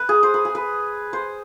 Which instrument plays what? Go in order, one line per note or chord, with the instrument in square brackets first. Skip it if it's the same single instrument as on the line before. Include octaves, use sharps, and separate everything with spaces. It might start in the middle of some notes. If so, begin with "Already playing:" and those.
Already playing: [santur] B4
G#4
C5
B4
G#4
B4
C5